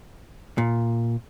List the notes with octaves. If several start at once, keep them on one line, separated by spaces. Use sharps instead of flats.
A#2